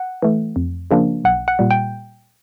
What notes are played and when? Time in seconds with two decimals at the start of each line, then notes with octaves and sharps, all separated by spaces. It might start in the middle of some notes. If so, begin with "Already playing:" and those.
Already playing: F#5
0.22 E3 A3
0.56 F2
0.91 C#3 F3 A#3 D4
1.24 B1 F#5
1.48 F#5
1.59 A#2 G3
1.71 G5